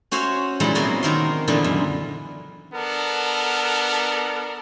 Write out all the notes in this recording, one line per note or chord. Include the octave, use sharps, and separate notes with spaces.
C#4 F#4 C5 C#5 E5
A#2 E3 G3 G#3 D#4 E4
C3 F#3 A#3 B3 F#4 D#5
D#3 A#3 C4 A#4 C6
A#2 D3 E3 G3 G#3 B3
F#2
B3 D4 A4 A#4